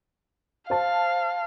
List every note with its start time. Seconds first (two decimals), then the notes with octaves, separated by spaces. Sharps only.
0.70 C5 F5 A5